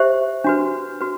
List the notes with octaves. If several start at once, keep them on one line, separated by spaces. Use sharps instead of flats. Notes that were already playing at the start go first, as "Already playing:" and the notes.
Already playing: G4 C5 E5
D4 F#4 B4
F#4 B4